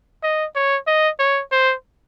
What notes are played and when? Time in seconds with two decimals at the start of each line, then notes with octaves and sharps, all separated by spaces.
0.23 D#5
0.56 C#5
0.87 D#5
1.19 C#5
1.52 C5